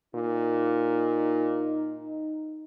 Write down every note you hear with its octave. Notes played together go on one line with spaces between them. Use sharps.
A#2 D#4